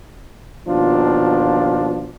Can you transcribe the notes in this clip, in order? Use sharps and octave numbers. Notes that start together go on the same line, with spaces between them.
D#2 B2 F3 D4 F4